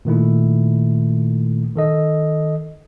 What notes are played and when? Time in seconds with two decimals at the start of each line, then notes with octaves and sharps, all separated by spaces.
0.05 A#2 D#3 A3 E4
1.76 D#3 A4 D#5